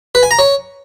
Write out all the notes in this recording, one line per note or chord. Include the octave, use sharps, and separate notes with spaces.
B4
G#5
A#5
C#5